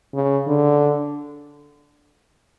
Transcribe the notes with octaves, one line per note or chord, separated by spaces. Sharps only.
C#3
D3